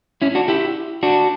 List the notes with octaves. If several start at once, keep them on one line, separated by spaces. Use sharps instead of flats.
C#4 E4
D4 F#4
E4 G4
D4 F#4